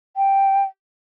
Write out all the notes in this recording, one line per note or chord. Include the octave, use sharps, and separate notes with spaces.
G5